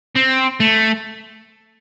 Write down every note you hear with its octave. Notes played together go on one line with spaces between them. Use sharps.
C4
A3